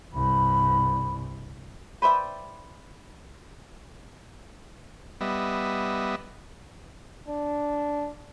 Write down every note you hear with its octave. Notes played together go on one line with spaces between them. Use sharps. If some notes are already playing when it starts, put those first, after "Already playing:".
C2 G2 B5
B4 C5 D5 E5 G5
G3 B3 D#5 E5
D4